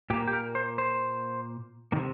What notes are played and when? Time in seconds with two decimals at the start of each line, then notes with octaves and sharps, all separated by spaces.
0.10 A#2 G4
0.13 A#3
0.28 G4
0.33 A#4
0.55 C5
0.78 C5
1.92 C3 D#3 A#3